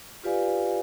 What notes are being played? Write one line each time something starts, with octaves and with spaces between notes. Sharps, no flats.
F4 G4 B4 D5 F5 G#5